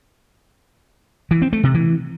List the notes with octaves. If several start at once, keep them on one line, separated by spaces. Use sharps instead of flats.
E3
C4
A3
C3
E3